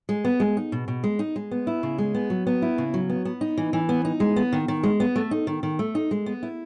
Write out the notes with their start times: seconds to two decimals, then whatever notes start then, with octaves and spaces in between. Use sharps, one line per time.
0.09 G#3
0.25 B3
0.40 G#3
0.57 D#4
0.72 B2
0.88 B2
1.04 G#3
1.19 D#4
1.36 G#3
1.51 B3
1.67 E4
1.83 C#3
1.98 G#3
2.14 B3
2.30 F#3
2.47 B3
2.62 E4
2.78 C#3
2.94 F#3
3.10 B3
3.25 B3
3.41 D#4
3.57 E3
3.73 E3
3.89 B3
4.05 D#4
4.20 G#3
4.36 B3
4.53 D#3
4.68 D#3
4.83 G#3
5.00 B3
5.16 A3
5.31 D#4
5.47 D#3
5.63 D#3
5.79 A3
5.95 D#4
6.11 G#3
6.26 B3
6.43 E4